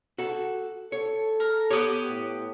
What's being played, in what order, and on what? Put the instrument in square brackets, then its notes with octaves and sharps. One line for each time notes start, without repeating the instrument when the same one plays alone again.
[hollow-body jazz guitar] F#4 A4
[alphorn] A4 [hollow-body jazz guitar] C#5
[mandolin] A#4
[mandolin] B3 G4 [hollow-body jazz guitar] C#5
[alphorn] A2